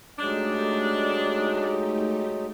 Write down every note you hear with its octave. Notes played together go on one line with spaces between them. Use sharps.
F#3 G#3 A3 D4 D#4 G4